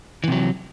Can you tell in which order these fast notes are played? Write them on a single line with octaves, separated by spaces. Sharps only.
E3 C3 F#3